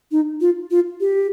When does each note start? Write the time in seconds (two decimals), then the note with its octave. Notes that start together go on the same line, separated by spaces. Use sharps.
0.12 D#4
0.41 F4
0.71 F4
1.01 G4